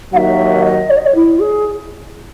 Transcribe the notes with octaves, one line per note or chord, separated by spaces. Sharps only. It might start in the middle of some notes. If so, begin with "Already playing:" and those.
D#2 D#3 F#3 E5 F#5
D#5
C#5
D#5
C#5
E4
G#4